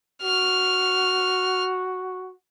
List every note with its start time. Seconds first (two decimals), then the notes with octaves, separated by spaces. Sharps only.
0.23 F#4 F6